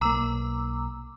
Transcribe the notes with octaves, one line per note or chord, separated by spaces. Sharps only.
B1 A#3 A#5 D6 E6